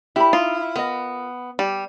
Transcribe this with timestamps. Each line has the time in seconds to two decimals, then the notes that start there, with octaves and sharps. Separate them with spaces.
0.16 E4 G4 A#4 B5
0.33 D#4 F4
0.76 B3 A#4 D#5
1.59 G3 G4